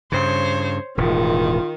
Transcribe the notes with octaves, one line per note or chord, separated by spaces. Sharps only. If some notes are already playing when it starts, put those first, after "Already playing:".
G2 C#3 C5 C#5
E1 A2 D#3 F4